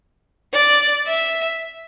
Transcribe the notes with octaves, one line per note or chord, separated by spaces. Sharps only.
D5
E5